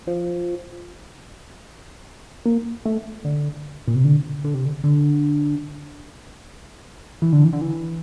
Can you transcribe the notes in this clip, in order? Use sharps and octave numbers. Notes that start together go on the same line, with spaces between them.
F3
A#3
A3
D3
A#2
C3
D3
D3
C3
D3
D3
E3
D3
E3
D3
E3